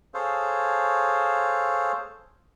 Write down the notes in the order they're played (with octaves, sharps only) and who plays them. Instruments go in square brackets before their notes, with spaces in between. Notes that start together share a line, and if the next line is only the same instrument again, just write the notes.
[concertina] G#4 A4 C5 C#5 F5